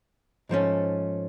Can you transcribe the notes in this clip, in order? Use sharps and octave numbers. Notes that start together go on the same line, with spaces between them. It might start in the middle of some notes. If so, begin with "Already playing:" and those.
G#2 F3 A3 C#4